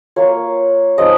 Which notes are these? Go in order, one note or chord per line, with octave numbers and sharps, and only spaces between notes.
A#3 F4 C#5
F3 G#3 D#4 D#5